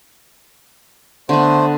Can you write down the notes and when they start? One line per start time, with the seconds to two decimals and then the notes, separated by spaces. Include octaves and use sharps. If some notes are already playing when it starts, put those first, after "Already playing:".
1.29 D3 A3 B3 C5